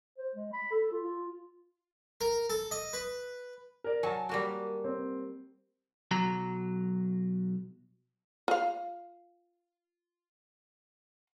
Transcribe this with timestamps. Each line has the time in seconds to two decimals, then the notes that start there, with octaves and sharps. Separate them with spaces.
0.18 C5
0.35 G#3
0.53 B5
0.71 A4
0.92 F4
1.03 F4
2.21 A#4
2.50 A4
2.71 D#5
2.93 B4
3.84 A#4 D5
4.03 F#3 G#5 A5
4.29 G3 A#3 F#4
4.84 C4
6.11 B1 F#3 A#5
8.48 F4 F5